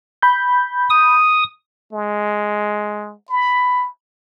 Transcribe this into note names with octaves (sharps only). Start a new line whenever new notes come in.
B5 G6
D#6
G#3
B5